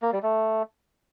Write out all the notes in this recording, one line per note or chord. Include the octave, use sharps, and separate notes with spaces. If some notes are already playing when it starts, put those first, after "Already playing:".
A#3
G3
A3